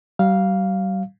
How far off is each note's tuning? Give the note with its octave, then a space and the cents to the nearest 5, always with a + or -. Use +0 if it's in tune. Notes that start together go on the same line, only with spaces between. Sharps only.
G3 -40 F5 +0